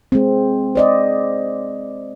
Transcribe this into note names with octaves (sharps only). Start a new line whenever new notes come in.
G#3 C4
C5 D5 D#5